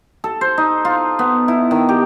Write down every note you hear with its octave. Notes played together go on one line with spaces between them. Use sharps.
A4
C5
D#4
F4
B3
E4
D#3
G4